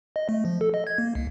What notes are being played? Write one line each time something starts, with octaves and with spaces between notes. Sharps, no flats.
D#5
A3
F3
A4
D#5
G#6
A#3
C2